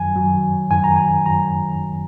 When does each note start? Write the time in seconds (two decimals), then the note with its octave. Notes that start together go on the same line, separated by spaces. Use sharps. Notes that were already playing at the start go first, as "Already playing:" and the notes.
Already playing: F#2 D#3 F#3 G#5
0.15 F#2 D#3 F#3
0.71 F#2 D#3 F#3 G#5
0.84 A#5
0.96 G#5
1.25 F#2 D#3 F#3 A#5